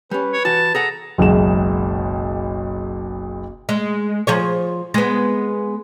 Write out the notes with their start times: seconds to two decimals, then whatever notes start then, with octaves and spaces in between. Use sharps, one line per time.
0.11 G3 C#4 B4
0.33 C#5
0.45 E3 F#4 A5
0.75 G#4 A4 F#5 A#5
1.18 F#1 B1 G#3 E7
3.69 G#3
4.27 F3 G#4 C#5
4.94 G#3 B3